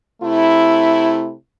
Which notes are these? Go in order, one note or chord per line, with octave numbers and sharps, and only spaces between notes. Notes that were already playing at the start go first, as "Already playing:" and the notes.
C3 A3 E4